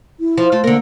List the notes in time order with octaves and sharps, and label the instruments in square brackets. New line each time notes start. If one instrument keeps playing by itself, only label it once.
[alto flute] E4
[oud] F3
A3 F4
[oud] D3 A#4 [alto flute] A#3